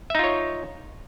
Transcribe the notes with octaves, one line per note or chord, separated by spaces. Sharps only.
D#4 F4 C#5 E5